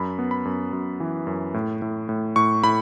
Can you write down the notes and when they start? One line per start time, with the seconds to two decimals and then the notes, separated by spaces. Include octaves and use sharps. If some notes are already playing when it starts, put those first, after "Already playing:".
Already playing: F#2 B5
0.19 B3
0.31 B5
0.45 F#2
0.73 F#2
1.00 E3
1.27 F#2
1.54 A2
1.82 A2
2.09 A2
2.36 A2 C#6
2.64 A2 B5